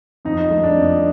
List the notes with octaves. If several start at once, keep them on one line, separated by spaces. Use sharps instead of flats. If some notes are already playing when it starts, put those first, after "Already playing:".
F2 D#4
A3
D4
F2